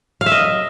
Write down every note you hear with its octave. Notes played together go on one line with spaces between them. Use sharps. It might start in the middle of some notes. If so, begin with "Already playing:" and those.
F5
E5
D#5